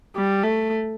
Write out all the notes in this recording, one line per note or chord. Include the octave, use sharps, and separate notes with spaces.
G3
A3